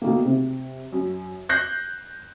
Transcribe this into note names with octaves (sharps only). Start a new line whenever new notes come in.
B2 D#3 A3 A#3
C3
F#2
F#6 G6 A#6 C7